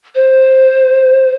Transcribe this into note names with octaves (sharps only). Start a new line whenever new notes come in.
C5